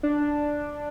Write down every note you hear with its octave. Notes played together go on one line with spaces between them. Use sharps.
D4